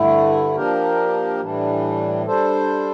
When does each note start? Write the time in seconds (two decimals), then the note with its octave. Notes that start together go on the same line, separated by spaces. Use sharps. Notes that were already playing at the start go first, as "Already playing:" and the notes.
Already playing: G2 D3 A3 E4
0.56 F3 A#3 D4 G4 A#4
1.40 A2 E3 G3 D4
2.26 G3 D4 A4 C5